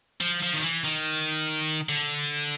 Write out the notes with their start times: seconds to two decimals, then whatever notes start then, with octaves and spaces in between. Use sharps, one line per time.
0.21 F3
0.43 F3
0.53 D#3
0.63 E3
0.84 D#3
1.89 D3